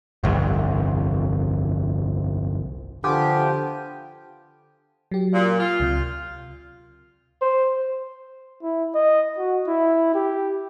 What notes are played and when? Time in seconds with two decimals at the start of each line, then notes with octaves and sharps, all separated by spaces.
0.24 G1 C2 F2
3.04 D3 F3 B3 F4 G4 G#5
5.11 F#3 G4
5.33 A#2
5.59 F4
5.80 C#2 C3 G6
7.41 C5
8.63 E4
8.95 D#5
9.38 F#4
9.68 E4
10.15 G4